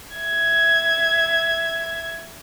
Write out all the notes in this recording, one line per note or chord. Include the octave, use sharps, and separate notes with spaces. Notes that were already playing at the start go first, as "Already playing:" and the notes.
E5 G#6